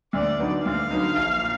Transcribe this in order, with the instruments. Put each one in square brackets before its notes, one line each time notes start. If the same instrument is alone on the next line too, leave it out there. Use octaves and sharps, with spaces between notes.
[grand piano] D2 [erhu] D5
[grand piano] D3 F#3 B3 D#4
[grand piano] D2 [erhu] F5
[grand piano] D3 F#3 B3 D#4
A#1
A#2